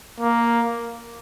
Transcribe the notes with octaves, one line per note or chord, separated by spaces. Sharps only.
A#3